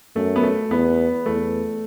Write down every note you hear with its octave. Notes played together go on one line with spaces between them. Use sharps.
F#2 A3
B3
A3
E2 B3
E2 A3